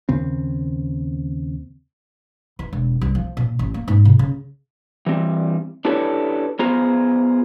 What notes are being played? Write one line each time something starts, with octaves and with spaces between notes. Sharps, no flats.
D#2 C#3 C4
E3
E1
C2
F3
A#2
A1
A#3
G#2
C3
C#3
E3 G3 C4
D4 E4 G4 A4 B4 C#5
B3 F4 G#4 C5 A#5